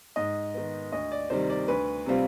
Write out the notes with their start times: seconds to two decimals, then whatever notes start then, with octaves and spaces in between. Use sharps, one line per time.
0.16 G#2 D#5
0.54 D#3 B3
0.92 D2 D#5
1.12 D5
1.30 C3 D#3 G3 C5
1.50 D5
1.68 D2 B4
2.06 C3 G3 C4 F4